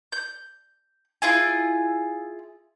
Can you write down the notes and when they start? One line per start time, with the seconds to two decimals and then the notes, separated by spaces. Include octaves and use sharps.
0.12 G6
1.22 E4 F4 G#4 G#5